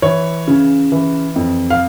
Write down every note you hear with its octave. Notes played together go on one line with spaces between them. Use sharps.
E3 C#5
C#3
E3
F2
F5